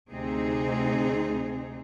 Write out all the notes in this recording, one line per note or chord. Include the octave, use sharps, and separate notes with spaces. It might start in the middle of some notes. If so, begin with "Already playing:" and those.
D2 C3 C4 D#4 G#4